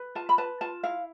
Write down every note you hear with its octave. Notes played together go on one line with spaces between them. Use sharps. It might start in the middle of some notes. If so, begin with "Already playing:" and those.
Already playing: B4
F4 A5
B5
B4 A5
F4 A5
E4 F5